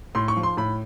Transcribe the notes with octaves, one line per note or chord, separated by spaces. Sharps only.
A2 C6
C#6
F3
C6
A2 B5